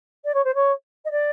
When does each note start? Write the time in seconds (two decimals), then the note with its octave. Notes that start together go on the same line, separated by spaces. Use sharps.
0.24 D5
0.34 C#5
0.44 C5
0.54 C#5
1.05 D#5
1.11 D5